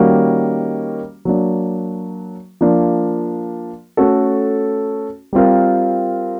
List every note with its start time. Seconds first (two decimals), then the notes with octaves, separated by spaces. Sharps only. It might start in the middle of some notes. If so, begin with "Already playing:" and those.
Already playing: D#3 G3 A#3 C#4 F#4
1.25 F#3 A#3 D4
2.61 F3 A#3 D4
3.97 A3 C#4 F#4 A4
5.33 G3 C4 F4 A#4